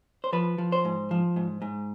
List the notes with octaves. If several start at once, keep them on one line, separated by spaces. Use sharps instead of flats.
C5
F3 B4
F3
C5
G#2
F3
G#2
G#2